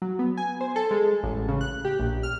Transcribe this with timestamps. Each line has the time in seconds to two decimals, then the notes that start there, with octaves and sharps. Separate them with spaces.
0.02 F#3
0.19 B3
0.37 G#5
0.61 C5
0.76 A4
0.91 G#3
1.23 A1
1.48 C#3
1.61 F#6
1.85 G4
2.00 A#1
2.23 F6